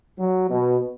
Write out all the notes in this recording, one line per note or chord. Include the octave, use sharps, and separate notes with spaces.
F#3
B2